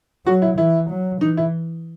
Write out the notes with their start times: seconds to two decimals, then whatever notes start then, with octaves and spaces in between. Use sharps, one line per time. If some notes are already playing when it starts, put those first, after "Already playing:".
0.26 F#3 F#4
0.42 E4
0.58 E3 E4
0.90 F#3
1.21 E3 D#4
1.37 E4